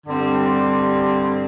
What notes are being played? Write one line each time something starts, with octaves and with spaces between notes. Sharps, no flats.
G2 D3 G3 C4